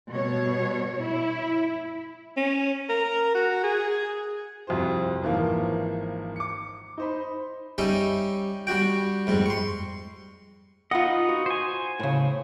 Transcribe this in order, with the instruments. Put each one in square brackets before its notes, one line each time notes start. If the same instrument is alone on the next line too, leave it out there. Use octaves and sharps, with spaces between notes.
[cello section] B2 G3 C#5
E4
[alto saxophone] C#4
A#4
F#4
G#4
[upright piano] C2 F2 F#4 C5
G#1 E3 F3 A#3
D6 C#7
D#4 C5 B5
[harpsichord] G3 C#4 D#4 G4 E5
G3 D4 F#4 G5
F2 G#2 G3
C6 C#6
[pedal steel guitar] D#4 B4 D#5 [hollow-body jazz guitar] F4 F#5
[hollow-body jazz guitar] F#4
[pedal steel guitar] C5 G#5
[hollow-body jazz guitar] A2 C#3